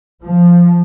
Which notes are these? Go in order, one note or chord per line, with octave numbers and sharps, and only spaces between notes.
F3